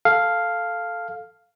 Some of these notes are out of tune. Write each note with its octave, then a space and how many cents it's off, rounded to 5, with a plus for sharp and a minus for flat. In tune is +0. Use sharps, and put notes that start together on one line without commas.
A4 +0 F5 +0